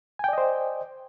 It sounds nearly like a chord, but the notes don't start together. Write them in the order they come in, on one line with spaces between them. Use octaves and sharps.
G#5 G5 D5 D#5 C5